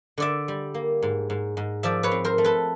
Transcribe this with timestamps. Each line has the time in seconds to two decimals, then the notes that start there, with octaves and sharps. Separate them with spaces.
0.18 D3 D5 E5
0.48 G3
0.74 A#3
1.02 G#2
1.30 G#2
1.57 G#2
1.83 F3 D5 E5
2.03 B4 C#5
2.11 C4
2.24 A#4 C5
2.38 A3
2.44 A4 B4